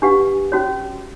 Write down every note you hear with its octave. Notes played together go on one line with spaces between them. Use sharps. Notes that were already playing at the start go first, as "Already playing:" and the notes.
D4 G4 B4 F#5
C#4 F#4 C#5